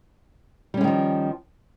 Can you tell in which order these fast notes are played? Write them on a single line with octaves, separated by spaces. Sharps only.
G3 C#4 G#3 D#3 F3